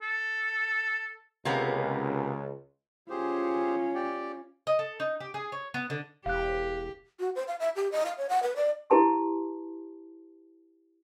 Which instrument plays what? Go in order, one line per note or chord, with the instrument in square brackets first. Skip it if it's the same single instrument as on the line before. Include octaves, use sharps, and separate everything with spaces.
[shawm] A4
[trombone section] C#2 [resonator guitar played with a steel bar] C3 A#3 B3
[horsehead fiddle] C#4 F4 [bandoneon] G4 G#4 C5
[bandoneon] G4 D5 G5
[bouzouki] D#5
A4
D#4
G4
G#4
C#5
B3
D3
[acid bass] E1 [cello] G4 [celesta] F5 F#6
[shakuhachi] F#4
C5
F5
E5
G4
D#5
F5
C#5
F#5
B4
D5
[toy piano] E4 G4 B4 A5 C6